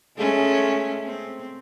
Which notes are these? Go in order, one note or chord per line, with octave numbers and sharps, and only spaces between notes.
G#3 A3 C#4
C4